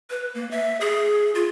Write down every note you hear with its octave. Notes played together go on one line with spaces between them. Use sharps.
B4
A#3
E5
G#4
F4